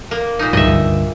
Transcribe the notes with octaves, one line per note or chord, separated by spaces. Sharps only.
A#3
A#2 D#4
C#2 G2 F#3 D#5 E5
C#2 G2 D3